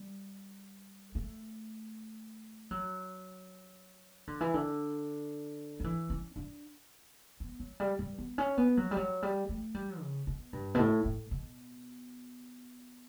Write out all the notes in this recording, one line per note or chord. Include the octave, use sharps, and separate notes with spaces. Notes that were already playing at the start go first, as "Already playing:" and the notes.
Already playing: G3
A3
F#3
D3
E3
D3
F#3
E3
C#4
D4
B3
F#3
G3
G3
B3
C#4
B3
F#3
G3
F#3
G3
A3
G3
C#3
B2
G2
B2
A2
A2
B2